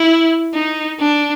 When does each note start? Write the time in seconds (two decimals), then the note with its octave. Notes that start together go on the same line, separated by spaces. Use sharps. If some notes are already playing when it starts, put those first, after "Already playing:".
Already playing: E4
0.54 D#4
1.00 D4